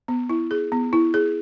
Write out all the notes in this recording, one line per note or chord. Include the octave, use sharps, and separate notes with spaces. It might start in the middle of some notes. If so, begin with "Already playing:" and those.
B3
E4
G#4
B3
E4
G#4